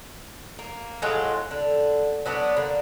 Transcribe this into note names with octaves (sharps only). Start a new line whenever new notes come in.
A#3
A2 F#3 G#3 F4
D3
F#3 B3 D4
D3 A#3